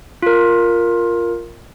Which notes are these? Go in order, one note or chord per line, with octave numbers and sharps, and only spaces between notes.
F4 A#4